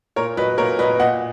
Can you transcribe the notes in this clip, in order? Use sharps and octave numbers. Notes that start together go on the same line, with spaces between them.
A#2 A#4 C#5
F#3 B4 D#5
A#2 A#4 C#5
F#3 B4 D#5
A#2 D#5 F#5